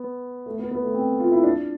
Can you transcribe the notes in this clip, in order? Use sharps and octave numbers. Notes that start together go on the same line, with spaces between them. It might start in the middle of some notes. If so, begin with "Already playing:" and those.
Already playing: B3
A3
B3
B3
A3
C4
F4
E4
D4